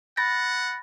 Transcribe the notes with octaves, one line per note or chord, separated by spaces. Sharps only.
F#5 B5 A6 A#6